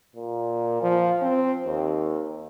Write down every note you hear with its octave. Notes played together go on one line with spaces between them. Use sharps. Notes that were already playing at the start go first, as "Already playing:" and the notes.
A#2
F3
C4
D#2